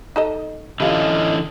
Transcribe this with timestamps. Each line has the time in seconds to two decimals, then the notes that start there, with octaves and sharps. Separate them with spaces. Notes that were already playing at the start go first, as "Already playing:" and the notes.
0.16 D#4 A4 D#5
0.80 D3 E3 G3 C#4 F4 D#5